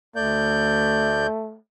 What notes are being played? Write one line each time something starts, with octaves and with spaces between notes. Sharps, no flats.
D2 A3 D5 G6